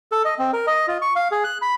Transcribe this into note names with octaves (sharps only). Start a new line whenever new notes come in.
A4
D#5
C4
A#4
D#5
F4
C#6
F5
G#4
F#6
B5